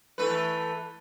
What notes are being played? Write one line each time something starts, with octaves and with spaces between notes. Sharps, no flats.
E3 A3 B4